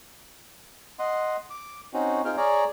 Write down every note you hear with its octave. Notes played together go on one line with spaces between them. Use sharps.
D#5 F#5 C6
D6
C4 C#4 D#4 F#4
C4 D#4 F4 G#4 G5 F6
G#4 C#5 D5 A#5